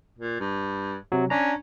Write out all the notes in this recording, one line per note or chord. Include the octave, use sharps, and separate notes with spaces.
A#2
G2
C3 F#3
C#4 D4 A#5